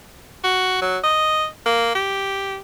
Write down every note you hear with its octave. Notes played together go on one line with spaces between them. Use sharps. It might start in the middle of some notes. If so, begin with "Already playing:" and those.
F#4
F#3
D#5
A#3
G4